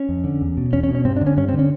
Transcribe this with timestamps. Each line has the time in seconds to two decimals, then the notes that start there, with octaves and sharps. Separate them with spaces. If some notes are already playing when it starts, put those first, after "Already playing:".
Already playing: C#4
0.09 F2
0.24 D3
0.41 E2
0.57 B2
0.73 E2 C#4
0.83 C#4
0.89 B2
0.95 C#4
1.05 G2 C4
1.16 D4
1.21 D3
1.27 C#4
1.37 G2 C#4
1.49 D3 C4
1.59 C#4